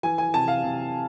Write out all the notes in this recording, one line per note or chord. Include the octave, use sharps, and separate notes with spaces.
E3 G#5
G#5
C3 A5
F5
C3